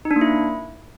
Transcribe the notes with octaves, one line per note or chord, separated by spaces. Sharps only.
D#4
D4
A#3
E4